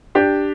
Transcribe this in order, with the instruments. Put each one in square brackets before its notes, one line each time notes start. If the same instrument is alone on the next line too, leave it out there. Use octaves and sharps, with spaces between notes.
[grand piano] D4 G4